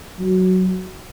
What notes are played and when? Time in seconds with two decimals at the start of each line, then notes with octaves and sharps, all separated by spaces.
0.19 F#3